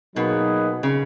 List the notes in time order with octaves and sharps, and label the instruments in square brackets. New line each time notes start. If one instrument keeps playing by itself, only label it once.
[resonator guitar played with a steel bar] B2 [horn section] F#3 A#3 D#4 G#4 B4
[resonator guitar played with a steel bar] C#3